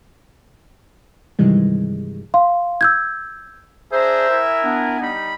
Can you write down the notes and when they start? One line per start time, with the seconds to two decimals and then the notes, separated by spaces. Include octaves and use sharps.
1.39 G2 C3 D#3 E3 G3 G#3
2.34 F5 C6
2.81 E6 G6 G#6
3.93 D4 G#4 C5 E5 A#5
4.29 E4 A#4 G#5
4.64 B3 D4
5.00 G3 D#4 B5